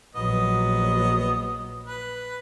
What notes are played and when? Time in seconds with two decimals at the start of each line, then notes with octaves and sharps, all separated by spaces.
0.15 A#1 F#3 B3 D#5
1.84 B4